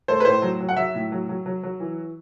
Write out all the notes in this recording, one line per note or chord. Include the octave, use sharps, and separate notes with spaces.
A3 C5
B4
A2 C5
F#3
F#3
F#5
F#3 E5
A2
F#3
F#3
F#3
F#3
E3